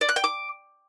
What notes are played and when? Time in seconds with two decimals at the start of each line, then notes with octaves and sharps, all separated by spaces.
0.01 D5
0.09 F#6
0.16 G5
0.24 D6